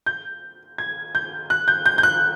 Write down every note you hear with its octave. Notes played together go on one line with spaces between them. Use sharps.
G6
G#6
G6
F#6
G6
G6
G6
F#6